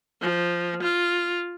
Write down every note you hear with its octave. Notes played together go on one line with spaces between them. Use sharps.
F3
F4